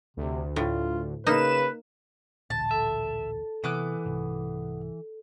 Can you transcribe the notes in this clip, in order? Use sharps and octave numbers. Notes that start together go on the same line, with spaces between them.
D2 C3
A2 F4
C#3 A#3 D#4 B4 E7
A1 D2 A#2 A5
A4 E5
C3 E3 B3 D6 F#6
C2 G#2 C3